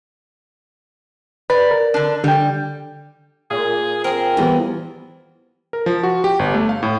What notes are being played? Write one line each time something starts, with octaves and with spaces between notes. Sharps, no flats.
B4 D5
A#4
D3 D4
D3 G3 G5
A#2 G#4
C4 G#4 A#4
E2 E3 G3 B3
A#4
F3
F#4
G4
G1
A3
F5
A2